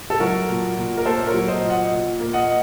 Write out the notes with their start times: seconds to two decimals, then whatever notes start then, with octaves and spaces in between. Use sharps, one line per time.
0.10 A4
0.20 F#3 F#4 A#4
0.49 A#2
0.77 A#2
0.97 A#4
1.06 A#3 A4 C5
1.27 A#4 C#5
1.34 F#3
1.48 C5 D#5
1.62 A#2
1.70 D#5 F#5
1.91 A#2
2.20 A#3
2.33 D#5 F#5